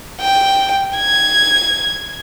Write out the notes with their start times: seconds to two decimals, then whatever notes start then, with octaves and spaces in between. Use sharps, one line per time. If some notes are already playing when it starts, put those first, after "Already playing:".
0.21 G5
0.97 G#6